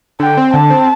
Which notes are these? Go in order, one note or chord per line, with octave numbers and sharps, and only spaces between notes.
D3 G5
C4
D3 A5
C4